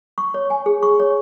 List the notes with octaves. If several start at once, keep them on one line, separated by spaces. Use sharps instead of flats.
C#6
C#5
G#5
G#4
C#6
C#5